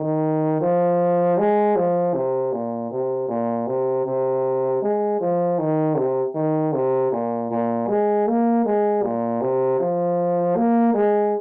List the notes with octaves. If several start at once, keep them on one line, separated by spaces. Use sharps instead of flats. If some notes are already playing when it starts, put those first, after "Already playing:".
Already playing: D#3
F3
G#3
F3
C3
A#2
C3
A#2
C3
C3
G#3
F3
D#3
C3
D#3
C3
A#2
A#2
G#3
A#3
G#3
A#2
C3
F3
A#3
G#3